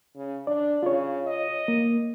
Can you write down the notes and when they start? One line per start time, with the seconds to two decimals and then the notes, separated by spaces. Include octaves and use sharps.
0.16 C#3
0.47 D4 D5
0.83 C#3 F4 C#5
1.26 D#5
1.68 A#3